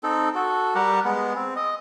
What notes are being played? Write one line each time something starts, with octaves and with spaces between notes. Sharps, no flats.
C4 D#4 A4
F#4 A4
G3 G4 A#4 F#5
G#3 B3
C4
D#5